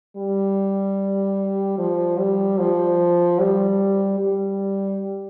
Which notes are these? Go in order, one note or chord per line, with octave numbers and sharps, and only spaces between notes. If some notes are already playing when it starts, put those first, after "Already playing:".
G3
F3
G3
F3
G3
G3